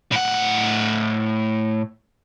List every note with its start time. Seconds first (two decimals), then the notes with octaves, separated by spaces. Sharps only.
0.12 A2 F#5